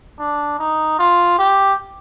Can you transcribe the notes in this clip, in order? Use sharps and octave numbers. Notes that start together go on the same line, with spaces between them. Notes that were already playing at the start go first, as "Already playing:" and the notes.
D4
D#4
F4
G4